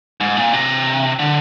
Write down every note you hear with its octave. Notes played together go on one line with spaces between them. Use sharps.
G#2
A#2
C3
D3